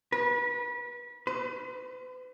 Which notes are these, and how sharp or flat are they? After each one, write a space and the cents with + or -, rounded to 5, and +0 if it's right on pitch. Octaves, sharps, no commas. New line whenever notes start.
B4 -30
B4 +45